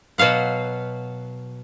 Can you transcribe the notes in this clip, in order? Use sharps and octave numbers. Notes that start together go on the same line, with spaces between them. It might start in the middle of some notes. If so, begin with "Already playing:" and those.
B2 F#3 F5 F#5